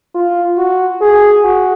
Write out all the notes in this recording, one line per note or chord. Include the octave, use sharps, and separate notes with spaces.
F4
F#4
G#4
F#4